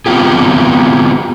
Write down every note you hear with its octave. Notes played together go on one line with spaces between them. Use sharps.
B3 C4 F4 G4 G#4